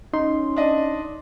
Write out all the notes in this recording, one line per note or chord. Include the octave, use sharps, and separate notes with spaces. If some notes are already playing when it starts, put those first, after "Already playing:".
C#4 D#4 C6
D4 D#5